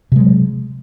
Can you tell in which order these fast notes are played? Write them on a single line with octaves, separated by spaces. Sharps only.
C3 G#3 F#3